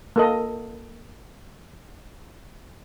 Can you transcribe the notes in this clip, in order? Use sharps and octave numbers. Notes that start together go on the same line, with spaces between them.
A#3 A4 D#5